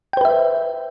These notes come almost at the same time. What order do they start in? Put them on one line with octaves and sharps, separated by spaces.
G5 C5 B4 E5